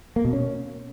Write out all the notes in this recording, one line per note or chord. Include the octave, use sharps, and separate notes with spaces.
A#3
B2
C#4